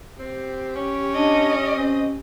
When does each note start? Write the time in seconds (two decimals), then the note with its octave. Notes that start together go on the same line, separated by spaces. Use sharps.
0.19 C4 G4
0.75 C#4
1.14 D4 D#5
1.76 C4 C#4